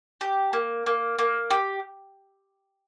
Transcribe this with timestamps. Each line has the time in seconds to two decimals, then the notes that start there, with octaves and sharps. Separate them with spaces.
0.21 G4
0.53 A#3
0.86 A#3
1.19 A#3
1.51 G4